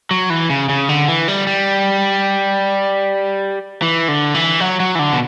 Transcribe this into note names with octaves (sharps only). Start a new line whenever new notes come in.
F#3
E3
C#3
C#3
D3
E3
G3
G3
E3
D3
E3
F#3
F#3
E3
D3
B2